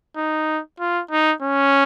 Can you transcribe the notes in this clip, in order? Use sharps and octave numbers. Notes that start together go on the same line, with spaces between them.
D#4
F4
D#4
C#4